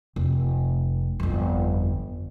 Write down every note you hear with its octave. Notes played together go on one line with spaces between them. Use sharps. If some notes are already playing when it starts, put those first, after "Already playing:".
F1
G1 F2